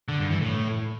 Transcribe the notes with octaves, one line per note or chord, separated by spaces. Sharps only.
D3
G2
E3
A2